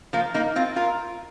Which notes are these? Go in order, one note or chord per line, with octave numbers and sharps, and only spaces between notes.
F3 A#3
A#3 D#4
C4 F4
F4 A#4